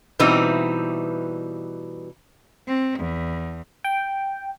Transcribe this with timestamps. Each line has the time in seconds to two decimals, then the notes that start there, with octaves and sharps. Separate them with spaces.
0.19 B2 E3 G3 C4 D#4
2.68 C4
2.99 E2
3.84 G5